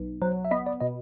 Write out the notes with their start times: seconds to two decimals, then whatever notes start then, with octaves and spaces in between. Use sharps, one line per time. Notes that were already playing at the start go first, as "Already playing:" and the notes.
Already playing: B1
0.22 F#3 C5
0.45 E5
0.51 B3 D#5
0.66 D5
0.81 B2 D#5